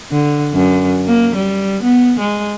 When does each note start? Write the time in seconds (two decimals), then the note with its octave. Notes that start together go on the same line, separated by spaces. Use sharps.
0.12 D3
0.54 F#2
1.07 A#3
1.35 G3
1.83 B3
2.20 G#3